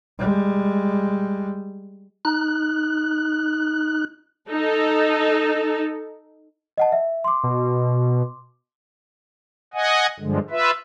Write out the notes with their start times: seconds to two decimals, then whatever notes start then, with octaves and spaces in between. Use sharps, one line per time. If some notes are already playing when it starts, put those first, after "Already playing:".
0.19 G3 G#3
2.25 D#4 F#6
4.50 D#4 A4
6.78 D#5 F#5 A5
6.92 E5
7.24 C6 D6
7.43 B2
9.74 D#5 F#5 G#5
10.20 G2 D3 F3 G#3
10.50 F4 B4 E5